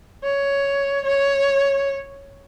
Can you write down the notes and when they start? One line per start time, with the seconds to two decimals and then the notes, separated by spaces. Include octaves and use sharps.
0.24 C#5
1.05 C#5